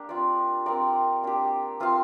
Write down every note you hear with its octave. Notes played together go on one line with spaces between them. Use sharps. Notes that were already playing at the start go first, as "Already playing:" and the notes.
Already playing: A#3 D4 G4
C4 F4 D5
C4 A#4 D5 F5
A#3 D4 G4
C4 F4 C5 F5